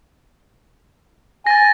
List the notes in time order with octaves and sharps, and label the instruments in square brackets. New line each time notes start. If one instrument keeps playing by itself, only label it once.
[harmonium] G#5 [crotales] A6 A#6